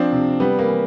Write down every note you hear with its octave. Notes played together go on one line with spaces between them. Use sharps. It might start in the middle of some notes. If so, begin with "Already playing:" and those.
Already playing: F3 C4 D4
C3
G3 B3
A#3
E3